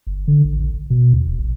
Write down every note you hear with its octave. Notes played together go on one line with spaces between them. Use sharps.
G1
D3
A1
A#1
G#1
B2
D#2
D1
A#1